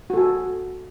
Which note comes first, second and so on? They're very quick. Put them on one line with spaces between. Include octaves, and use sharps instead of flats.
F#4 A4 G#5